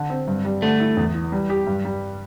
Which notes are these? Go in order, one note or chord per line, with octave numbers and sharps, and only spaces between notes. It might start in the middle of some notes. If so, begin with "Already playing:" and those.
Already playing: D3
C4
G2
G3
D3 A3
E4
E2
E3
G3
G4
G2
G3